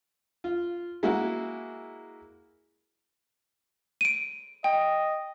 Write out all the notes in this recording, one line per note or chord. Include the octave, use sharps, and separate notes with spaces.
F4
G#3 A#3 E4 F#4
D7 D#7
D#5 G5